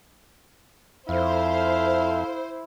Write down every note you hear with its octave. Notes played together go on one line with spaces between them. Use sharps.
F2 E4 A4 C5 E5 F5